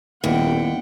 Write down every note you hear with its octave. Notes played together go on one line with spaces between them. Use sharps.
D#1 D#2 B3 E4 F#5 G5